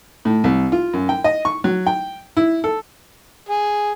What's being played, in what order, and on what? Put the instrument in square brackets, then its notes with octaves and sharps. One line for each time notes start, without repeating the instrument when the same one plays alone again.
[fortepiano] A2
C2
F4
F#2
G5
D#5
C#6
F#3
G5
E4
A4
[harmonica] G#4